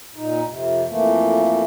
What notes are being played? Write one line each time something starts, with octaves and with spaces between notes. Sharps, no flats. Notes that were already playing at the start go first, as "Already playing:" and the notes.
A#2 D#4
F2 C3
F2 E3 A3 A#3